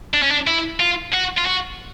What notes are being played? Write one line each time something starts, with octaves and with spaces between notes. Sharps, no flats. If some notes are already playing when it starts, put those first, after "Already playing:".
D4
C#4
D4
E4
F4
F#4
F4
F#4